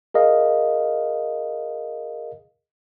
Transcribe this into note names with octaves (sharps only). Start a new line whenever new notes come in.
G#4 A#4 D#5 F5